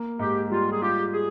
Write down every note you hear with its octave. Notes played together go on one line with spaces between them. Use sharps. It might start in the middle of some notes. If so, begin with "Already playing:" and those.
Already playing: A#3
G#2 G4
G3 F4
G#4
F4 G4
G#4